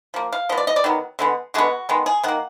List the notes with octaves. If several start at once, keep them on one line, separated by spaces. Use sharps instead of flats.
F3 A#3
F5
F3 B3 D#5
D5
D#5
D5
D#3 F#3 B3
D3 G#3 B3
D3 G#3 B3 F#4
D#3 G#3 B3
G#4
D#3 A#3 F#5